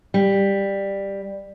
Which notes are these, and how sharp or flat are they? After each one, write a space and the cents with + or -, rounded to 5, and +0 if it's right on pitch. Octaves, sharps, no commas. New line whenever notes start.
G3 +10